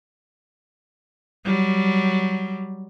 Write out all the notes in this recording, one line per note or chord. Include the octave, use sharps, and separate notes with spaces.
F#3 G3